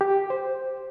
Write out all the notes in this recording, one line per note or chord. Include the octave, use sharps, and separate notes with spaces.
G4
C5